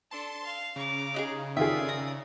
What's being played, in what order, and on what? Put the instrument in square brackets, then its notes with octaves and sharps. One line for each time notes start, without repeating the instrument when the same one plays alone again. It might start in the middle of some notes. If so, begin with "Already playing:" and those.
[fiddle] D4 A4 [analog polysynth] A5 C6
[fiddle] F5
[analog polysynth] C#3 [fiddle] A#5 D6
[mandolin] D#4 F#4 G#4
[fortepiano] D#3 F4 G#4 [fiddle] D5 D#6 [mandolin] E5
[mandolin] A#5